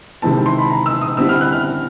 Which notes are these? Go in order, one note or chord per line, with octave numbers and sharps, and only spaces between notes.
C3 D#3 G#3 C4 E4 A5
C6
B5
A#5
E6
D#6
D3 G3 C4 E4 E6
F6
F#6
F6